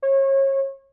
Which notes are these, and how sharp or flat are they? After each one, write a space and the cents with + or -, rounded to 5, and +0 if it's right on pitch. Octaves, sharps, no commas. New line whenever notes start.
C#5 -30